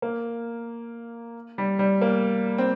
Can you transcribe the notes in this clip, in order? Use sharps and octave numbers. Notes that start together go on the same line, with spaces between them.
A#3
G3
G3
A#3
C4